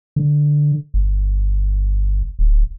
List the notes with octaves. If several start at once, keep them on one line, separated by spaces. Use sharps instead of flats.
D3
G1
D1